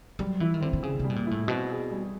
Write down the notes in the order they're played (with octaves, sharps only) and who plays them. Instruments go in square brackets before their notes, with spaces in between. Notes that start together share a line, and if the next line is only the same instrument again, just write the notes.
[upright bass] F#3 [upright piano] G3
[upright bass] E3 [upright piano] E4
[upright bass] D#3
[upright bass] D3 [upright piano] C4
[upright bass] D3
[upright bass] C#3 [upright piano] G#4
[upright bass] C3 [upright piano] G3
[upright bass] B2
A#2
[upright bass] A2 [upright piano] E4
[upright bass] B2 [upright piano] C4
[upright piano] G#4
G3